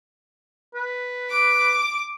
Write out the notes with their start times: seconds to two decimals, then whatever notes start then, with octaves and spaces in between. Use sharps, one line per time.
0.74 B4
1.31 D6